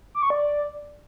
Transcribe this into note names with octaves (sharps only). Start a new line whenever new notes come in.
D6
C#6
D5